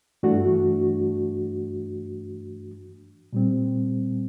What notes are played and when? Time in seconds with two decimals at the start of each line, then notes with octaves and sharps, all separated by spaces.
0.23 G2 E3 A3 D4 F#4
3.33 A#2 G3 C4